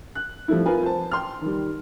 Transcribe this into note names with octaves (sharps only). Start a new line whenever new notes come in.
F#6
F3 G3 A3 C4 E4
F4 A#4 B4 G#5
C5 A5
G5 C6 F6
D#3 G3